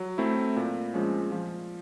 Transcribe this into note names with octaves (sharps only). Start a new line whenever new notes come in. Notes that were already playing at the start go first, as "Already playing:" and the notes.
Already playing: F#3
A3 C4 E4
A#2
F3 G#3 C#4
F3